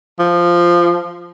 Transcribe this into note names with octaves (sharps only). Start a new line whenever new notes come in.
F3